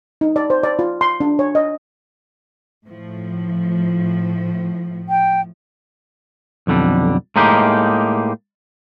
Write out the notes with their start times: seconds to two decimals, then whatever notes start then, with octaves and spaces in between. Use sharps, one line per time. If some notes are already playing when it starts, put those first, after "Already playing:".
0.21 D#4
0.36 D5
0.50 C5
0.63 D5
0.79 F4
1.01 C6
1.20 D4
1.39 C#5
1.55 D#5
2.86 A2 F3
5.09 G5
6.67 B1 F2 D3 G3
7.36 A2 G#3 A#3 D#4 G4